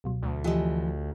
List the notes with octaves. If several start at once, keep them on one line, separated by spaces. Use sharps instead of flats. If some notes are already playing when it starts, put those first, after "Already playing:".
C#2 B2 F#3
D2
E3 F3 F4 G4 D#5